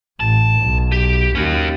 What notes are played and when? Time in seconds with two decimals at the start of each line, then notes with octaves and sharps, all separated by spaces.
0.20 A1 A5
0.61 B1
0.92 G4
1.35 D#2 C#4 F#4